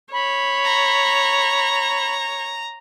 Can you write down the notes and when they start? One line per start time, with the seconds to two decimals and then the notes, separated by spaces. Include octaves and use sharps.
0.13 C#5 B5
0.64 A#5